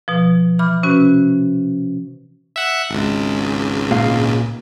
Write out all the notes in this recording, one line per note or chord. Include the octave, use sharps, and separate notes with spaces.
B2 F3
E3 B5 D6 F6
C3 C#4 F#4 B4
E5 F#5
G#1 C#2
A#2 F5